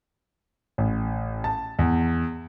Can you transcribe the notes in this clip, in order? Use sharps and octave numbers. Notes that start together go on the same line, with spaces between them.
A1
A5
E2